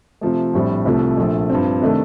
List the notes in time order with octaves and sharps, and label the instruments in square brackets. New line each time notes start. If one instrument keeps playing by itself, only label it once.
[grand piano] C3 F3 A3
A#1 A2 G3 C4
C2 C3 F3 A3 C4
A#1 A#2 A3
G2 F3 C4
C3 D#3 A3 D4 A4